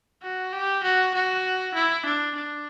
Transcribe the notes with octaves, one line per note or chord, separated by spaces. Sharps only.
F#4
G4
F#4
F#4
E4
D4
D4